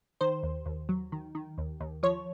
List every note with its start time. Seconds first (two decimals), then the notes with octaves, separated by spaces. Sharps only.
0.21 D#3 C5
0.43 D#2
0.66 D#2
0.89 F#3
1.12 D#3
1.35 D#3
1.58 D#2
1.80 D#2
2.03 F3 C#5